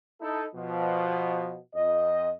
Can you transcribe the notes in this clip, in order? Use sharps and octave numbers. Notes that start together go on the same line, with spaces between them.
D#4 E4 A4
B2 F3
F2 D#5